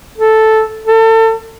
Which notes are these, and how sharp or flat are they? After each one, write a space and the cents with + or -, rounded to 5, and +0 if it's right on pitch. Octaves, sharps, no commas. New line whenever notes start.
A4 -5
A4 +30